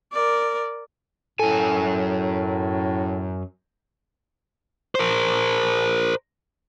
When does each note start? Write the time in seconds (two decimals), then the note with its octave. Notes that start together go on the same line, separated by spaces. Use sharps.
0.13 A#4 D5
1.40 F#2 A2 A4 G#5
4.95 A#4 C5